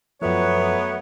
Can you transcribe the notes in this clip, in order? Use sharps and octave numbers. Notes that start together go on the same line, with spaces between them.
F#2 F3 F#3 A3 B3 C#5